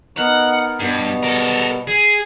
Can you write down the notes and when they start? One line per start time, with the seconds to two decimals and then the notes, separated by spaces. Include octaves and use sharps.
0.18 B3 D#4 A#4 F#5
0.80 G2 B2 G3 B3
1.23 A4 A#4
1.87 G#4